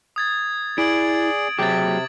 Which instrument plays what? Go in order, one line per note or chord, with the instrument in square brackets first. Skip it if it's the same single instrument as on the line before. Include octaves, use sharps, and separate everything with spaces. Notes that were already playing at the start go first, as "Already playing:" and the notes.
[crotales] D#6 G#6 A6
[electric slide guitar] E4 [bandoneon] G#4 D5 [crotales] D7 F#7
[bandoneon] C3 [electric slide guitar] F#3 G#4 G5 [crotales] D6 A6